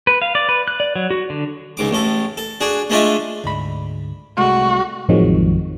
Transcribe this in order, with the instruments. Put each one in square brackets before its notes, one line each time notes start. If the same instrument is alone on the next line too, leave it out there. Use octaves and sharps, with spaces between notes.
[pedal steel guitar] B4
F5
D5
B4
F#6
D5
F#3
F#4
D3
[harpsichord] C#2 G#2 D6
A1 A2 A4
A4
D4 F#4 G#4
G#3 A3 D4 F4 D#5 E5
[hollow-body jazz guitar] D2 G#2 B5
[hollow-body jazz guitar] C2 G#3 A3 [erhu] F#4
[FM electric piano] A1 F2 D#3 F3 F#3 G#3